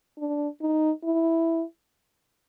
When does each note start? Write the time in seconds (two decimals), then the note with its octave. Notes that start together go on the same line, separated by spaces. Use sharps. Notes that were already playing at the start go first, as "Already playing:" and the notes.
0.18 D4
0.61 D#4
1.04 E4